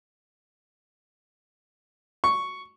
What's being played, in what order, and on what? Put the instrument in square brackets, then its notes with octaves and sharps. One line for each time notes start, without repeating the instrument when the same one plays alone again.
[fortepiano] C#6